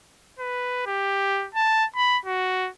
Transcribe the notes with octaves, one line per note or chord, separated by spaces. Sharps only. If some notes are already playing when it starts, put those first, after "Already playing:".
B4
G4
A5
B5
F#4